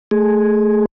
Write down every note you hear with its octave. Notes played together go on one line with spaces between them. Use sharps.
A3 G#4